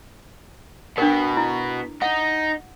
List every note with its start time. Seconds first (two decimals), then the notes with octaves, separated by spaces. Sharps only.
0.98 B2 B3 D4 A#4
1.37 E4
2.02 D#4 F#5